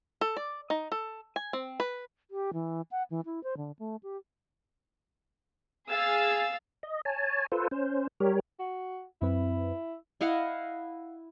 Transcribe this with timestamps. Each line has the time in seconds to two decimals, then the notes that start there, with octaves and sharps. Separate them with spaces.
0.21 A4
0.37 D5
0.70 D#4
0.92 A4
1.36 G#5
1.53 C4
1.80 B4
2.31 G4
2.54 E3
2.91 F#5
3.10 E3
3.26 E4
3.44 C5
3.57 D3
3.79 A3
4.03 G4
5.89 G#4 F5 E6 A6
6.83 D#5
7.05 C#5 G#5 A5
7.52 F4 A4 B4 C5
7.71 C#4 C5
8.20 G3 G4 A#4 C#5
8.59 F#4
9.22 F#2 C4 E4 B4
10.21 E4 D#5 F5 F#5